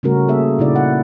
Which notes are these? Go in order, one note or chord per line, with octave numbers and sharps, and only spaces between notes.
C#3 G3 A3 C#4 F#4 A#4
A#3 G#4 A4 E5
A#2 C#3 D#4 E4 D5
F#5